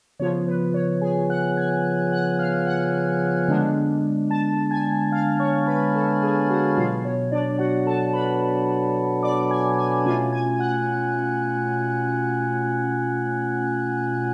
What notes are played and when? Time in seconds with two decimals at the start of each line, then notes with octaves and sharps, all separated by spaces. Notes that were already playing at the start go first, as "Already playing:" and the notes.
0.19 C#3 F3 B3 F4 C#5
0.48 B4
0.74 C#5
1.01 G#4 G#5
1.30 F#5 F#6
1.57 G#5 G#6
2.12 F#5 F#6
2.39 F5 F6
2.66 F#5 F#6
3.48 D3 G#3 B3 D4
4.30 A5 A6
4.71 G#5 G#6
5.12 F5 F6
5.40 C#5 C#6
5.67 B4 B5
5.94 A4 A5
6.22 G#4 G#5
6.50 F#4 F#5
6.77 B2 F#3 B3 F4 F5
7.05 C#5
7.32 D4 D5
7.59 F#4 F#5
7.86 A4 A5
8.13 B4 B5
9.23 D5 D6
9.50 G#5 G#6
9.77 G#5 G#6
10.05 B2 A3 C#4 F4 G#5 G#6
10.32 G#5 G#6
10.59 F#5 F#6